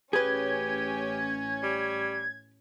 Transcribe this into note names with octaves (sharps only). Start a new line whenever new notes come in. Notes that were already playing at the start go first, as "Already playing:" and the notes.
A1 C#4 G4 G#4 B4 G#6
G3